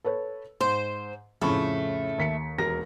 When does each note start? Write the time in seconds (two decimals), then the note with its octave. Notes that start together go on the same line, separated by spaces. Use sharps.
0.04 A4 B4 C#5
0.61 G#2 C5
1.42 F2 A2 C#3 A3 B5 C#6
2.18 D#2 B6 C#7
2.58 E1 A#4 A#6